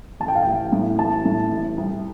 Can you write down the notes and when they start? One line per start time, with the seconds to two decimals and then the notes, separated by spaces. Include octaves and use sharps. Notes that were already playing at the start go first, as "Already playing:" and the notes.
0.20 A1 A5
0.28 G5
0.35 F5
0.43 A1 G5
0.72 A2
0.99 A1 A5
1.25 A2
1.52 A1
1.78 C2